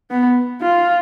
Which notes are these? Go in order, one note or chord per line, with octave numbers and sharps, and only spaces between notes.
B3
F4